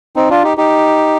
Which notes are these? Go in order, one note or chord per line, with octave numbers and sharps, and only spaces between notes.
C4 D#4
D4 F4
D#4 G4
D#4 G4